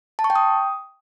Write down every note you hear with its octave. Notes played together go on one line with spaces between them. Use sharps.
A5
C#6
G5
D#6